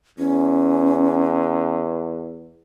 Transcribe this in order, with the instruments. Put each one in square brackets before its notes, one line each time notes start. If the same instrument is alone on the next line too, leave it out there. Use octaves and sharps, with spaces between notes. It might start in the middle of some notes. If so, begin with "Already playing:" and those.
[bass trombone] E2 [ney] C#4